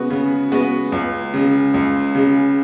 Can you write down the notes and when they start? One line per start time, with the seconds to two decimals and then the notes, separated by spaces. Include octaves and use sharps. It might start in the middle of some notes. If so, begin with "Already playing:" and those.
Already playing: C#3 G#3 B3 F#4 B4
0.10 C#3
0.52 G#3 B3 F#4 B4
0.92 C#2
1.34 C#3 G#3
1.74 C#2
2.15 C#3 G#3